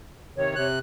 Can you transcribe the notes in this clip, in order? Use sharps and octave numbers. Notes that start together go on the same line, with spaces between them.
C3 D#3 C#5
C3 F#6